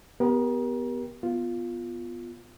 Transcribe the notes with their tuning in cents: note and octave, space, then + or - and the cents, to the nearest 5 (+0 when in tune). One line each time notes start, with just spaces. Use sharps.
B3 +0 G4 +0 A#4 +30
B3 +0 F4 +0